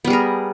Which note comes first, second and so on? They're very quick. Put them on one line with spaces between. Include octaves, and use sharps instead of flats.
B3 G3 G#4 A#4